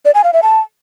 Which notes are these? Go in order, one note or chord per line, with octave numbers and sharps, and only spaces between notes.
D5
G#5
F5
E5
A5